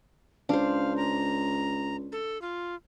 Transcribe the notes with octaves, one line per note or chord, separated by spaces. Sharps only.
C#2 D4 C5 F5
A#5
A4
F4